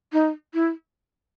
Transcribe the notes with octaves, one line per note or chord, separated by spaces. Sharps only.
D#4
E4